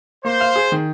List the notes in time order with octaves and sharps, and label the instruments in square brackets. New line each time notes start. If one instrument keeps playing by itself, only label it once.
[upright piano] A#3 [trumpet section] C5
[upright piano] F5
G#4
D#3